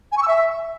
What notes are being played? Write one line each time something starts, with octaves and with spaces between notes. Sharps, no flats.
G#5
C#6
E6
E5